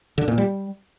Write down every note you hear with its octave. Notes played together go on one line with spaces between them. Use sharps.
D3
A#2
G3